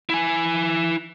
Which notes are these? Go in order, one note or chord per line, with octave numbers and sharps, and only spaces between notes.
E4 G#5